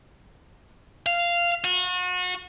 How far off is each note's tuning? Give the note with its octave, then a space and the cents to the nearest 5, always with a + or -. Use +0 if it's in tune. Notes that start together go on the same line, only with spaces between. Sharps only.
F5 -10
F#4 -35